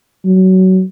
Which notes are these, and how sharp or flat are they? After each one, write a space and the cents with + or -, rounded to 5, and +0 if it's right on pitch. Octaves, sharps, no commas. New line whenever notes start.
F#3 +20